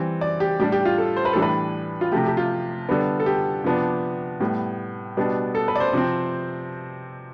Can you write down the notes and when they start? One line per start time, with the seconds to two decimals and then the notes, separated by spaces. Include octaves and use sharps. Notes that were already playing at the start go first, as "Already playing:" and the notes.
Already playing: E3 G3 C4
0.21 D5
0.40 G4
0.59 A2 G3 D4 G4
0.72 G4
0.85 F4
0.98 A4
1.16 C5
1.25 B4
1.33 A2 E3 G3 D4 A4
1.42 B4
2.01 F4
2.12 C3 F3 A3 G4
2.27 G4
2.37 F4
2.88 D3 G3 B3 D4
3.20 A4
3.26 G4
3.64 C3 F3 B3 D4
4.40 A2 G3 B3
5.17 B2 G3 B3 D4
5.55 A4
5.68 B4
5.76 D5
5.80 C5
5.93 C3 F3 C4